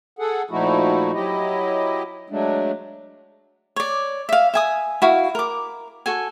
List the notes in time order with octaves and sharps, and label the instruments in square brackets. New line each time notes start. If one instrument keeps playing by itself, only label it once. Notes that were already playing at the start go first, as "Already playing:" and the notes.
[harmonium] G#4 A4 F#5
A#2 F3 A3 D#4 E4 F#4
F#3 E4 G4 D#5
F#3 G#3 A3 D4
[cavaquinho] C#5 D5
E5 F5
E5 G#5 D#6
E4 F#4 F5
A#4 D6
F#4 A4 G#5